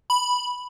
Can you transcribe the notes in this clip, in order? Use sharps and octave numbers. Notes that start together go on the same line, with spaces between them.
B5